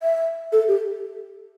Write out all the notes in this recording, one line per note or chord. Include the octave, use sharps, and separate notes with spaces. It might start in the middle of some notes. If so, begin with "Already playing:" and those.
E5
A4
G4